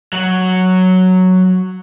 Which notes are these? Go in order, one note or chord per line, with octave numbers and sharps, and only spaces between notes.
F#3 F#4